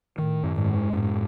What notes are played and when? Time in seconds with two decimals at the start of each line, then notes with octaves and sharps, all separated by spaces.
0.18 A2 D#3
0.43 F#2
0.55 G#2
0.69 G#3
0.93 F#2 A2